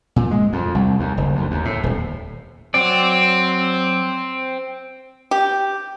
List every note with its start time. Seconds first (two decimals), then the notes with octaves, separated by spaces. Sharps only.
0.16 A#2
0.31 G#3
0.53 F2
0.75 C2
0.99 D#2
1.17 F#1
1.36 D2
1.51 D#2
1.65 A2
1.83 D#1
2.74 F#3 C4 D5
5.31 G4